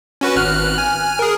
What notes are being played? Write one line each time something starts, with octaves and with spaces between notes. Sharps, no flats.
C#4 F#4 B4
G#1 F6 F#6
G#5 F6
G#4 A#4